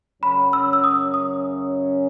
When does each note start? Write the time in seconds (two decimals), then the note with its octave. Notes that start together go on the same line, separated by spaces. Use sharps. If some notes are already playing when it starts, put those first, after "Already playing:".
0.22 F#2 C#3 F#3 C#4 B5
0.53 E6
0.73 E6
0.84 D#6
1.14 D#6